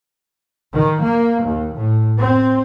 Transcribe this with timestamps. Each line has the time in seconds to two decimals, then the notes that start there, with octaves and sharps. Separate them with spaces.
0.73 D#3
1.02 A#3
1.43 D#2
1.75 A2
2.18 C4